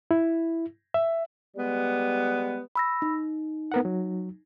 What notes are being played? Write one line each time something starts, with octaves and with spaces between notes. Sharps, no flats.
E4
E5
G3 G#3 B3
B5 E6 A#6
D#4
B3 A#4 F#5
F#3